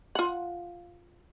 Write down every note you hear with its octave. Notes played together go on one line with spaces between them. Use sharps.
F4 F#5